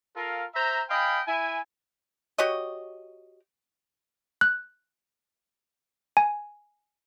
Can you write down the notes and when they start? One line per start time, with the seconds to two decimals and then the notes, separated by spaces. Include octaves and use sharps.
0.16 F4 A4 A#4 F5
0.55 C5 E5 A#5
0.90 D#5 F5 G5 G#5 B5
1.27 E4 G#5
2.38 F#4 G4 C#5 D#5
4.41 F#6
6.17 G#5